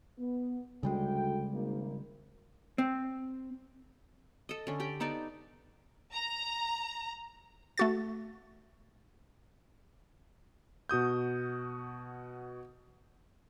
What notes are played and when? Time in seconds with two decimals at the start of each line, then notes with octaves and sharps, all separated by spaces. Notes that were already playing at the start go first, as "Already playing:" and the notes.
0.18 B3
0.83 D2 C#3 G3 G#3 G5
1.52 G#1 A#3
2.78 C4
4.49 A4 D#5
4.67 D3 C#4
4.80 G4 D5 G5
5.00 B3 D#4 A4 D5
6.13 A#5
7.78 A3 F#4 A6
10.89 B2 F#4 D#6 G6